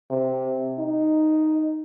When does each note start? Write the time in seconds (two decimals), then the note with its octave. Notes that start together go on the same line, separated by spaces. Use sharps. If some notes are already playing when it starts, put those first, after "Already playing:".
0.11 C3
0.79 D#4